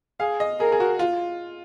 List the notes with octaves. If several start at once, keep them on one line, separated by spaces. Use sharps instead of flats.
G#4 F5
D#5
G#4 A#4
G#4
F#4
F4